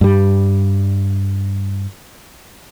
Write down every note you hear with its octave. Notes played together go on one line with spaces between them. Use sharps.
G2 G3